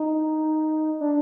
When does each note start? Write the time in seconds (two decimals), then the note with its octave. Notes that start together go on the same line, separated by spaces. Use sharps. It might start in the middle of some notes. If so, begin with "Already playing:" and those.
Already playing: D#4
1.01 D4